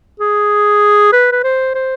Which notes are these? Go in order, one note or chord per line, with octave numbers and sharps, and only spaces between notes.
G#4
B4
B4
C5
C5